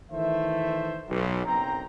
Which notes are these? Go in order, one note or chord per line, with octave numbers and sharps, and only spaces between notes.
D#3 E3 A3 C5 E5
B1 F#3
F#1 B1 C4 G5 A#5